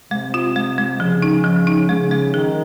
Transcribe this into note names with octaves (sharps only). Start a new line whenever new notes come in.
C3 G#3
F4
G#3
G#3
C#3 F3
D#4
F3
D#4
C#3 G#3
G#3
D#3 G#4